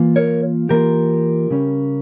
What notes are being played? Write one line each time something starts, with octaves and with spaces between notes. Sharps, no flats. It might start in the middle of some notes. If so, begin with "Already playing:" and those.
Already playing: E3 A#3 F4
A#4 C#5
E3 A#3 F4 G4 A#4
C#3 G3 C#4